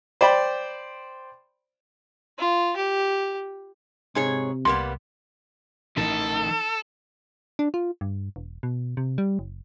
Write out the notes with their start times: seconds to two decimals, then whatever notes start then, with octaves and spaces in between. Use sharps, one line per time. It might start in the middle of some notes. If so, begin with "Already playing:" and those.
0.21 C5 D5 G5 B5
2.39 F4
2.77 G4
4.15 G#2 C3 G#4 C#5
4.65 C2 G3 A#3 B3 C6
5.97 A1 A2 E3 D#4 A4 A#4
7.59 D4
7.74 F4
8.01 G2
8.36 E1
8.63 B2
8.97 C3
9.18 G3
9.39 F#1